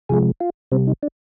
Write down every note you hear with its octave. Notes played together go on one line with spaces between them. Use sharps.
C3 F3 G#3 G#4
F4
C3 G3 C4
D#4
D4